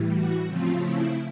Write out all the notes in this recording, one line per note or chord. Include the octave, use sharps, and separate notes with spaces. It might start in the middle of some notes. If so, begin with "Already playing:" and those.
Already playing: A2 E3 G3
F#4
C#3 F3 A3 C4 F4
E4